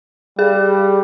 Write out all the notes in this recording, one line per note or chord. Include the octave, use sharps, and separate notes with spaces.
G3 G#4